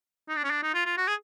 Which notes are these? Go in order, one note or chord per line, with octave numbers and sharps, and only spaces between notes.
D#4
D4
C#4
D4
D#4
F4
F4
F#4
G#4